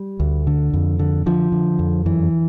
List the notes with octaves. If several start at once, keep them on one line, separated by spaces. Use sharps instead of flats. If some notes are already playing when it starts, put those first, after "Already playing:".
Already playing: G3
D2
D3
F2
D3
D3 F3
D3
F2
F#2 E3